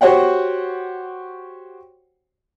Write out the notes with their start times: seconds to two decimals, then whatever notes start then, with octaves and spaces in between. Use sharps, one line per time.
0.01 F#4 G4 C5 C#5 F#5 G5